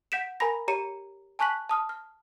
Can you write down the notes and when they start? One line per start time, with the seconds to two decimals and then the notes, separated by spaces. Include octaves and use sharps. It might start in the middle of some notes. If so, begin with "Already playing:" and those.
0.12 F#5 G6 B6 D7 E7
0.40 A#4 G#5 A#5 B5 A#6
0.68 G4 C#5 A#5 C#7 D#7
1.39 G#5 A5 C#6 F#6 B6 F#7
1.69 A5 D#6 F6
1.89 F6